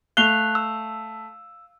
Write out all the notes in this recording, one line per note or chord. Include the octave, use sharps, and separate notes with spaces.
A3 F5 F#6 C7 F7 G7
E6